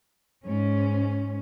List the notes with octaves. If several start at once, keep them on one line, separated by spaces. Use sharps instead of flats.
G#2 C#4